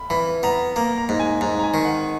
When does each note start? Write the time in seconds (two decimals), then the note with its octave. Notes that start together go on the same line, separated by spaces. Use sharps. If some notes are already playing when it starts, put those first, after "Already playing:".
Already playing: B5
0.10 E3 B5
0.43 B3 A#5
0.76 A#3 A#5
0.98 A#5
1.09 G#2
1.19 G#5
1.41 G#2 A#5
1.59 A#5
1.63 G#5
1.74 D#3
1.85 F#5